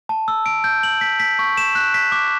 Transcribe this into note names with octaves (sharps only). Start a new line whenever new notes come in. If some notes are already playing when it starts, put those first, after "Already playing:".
A5
E6
D7
G6
F#7
B6
B6
C#6
E7
F#6
B6
D6